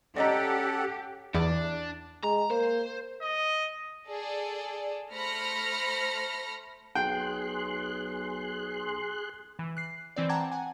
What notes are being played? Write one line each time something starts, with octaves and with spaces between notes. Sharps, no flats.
C#4 G4 A4 D5 D#5 F#5 A#5
E2 D4
G#3 A#5
A#3 C5
D#5
G#4 A4 D5
A3 C5 B5 F6 A#6 C#7
B1 G#4 G5 C6 F#6
E3
F#6 C7
E3 C4 D5
F#5 G5 A5 A#5 D6 G#6
F#5 G#5